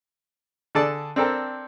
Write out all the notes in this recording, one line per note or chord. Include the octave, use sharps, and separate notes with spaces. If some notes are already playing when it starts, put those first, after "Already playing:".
D3 G#4 A4 D5 A5
C4 D4 A4 A#4 G5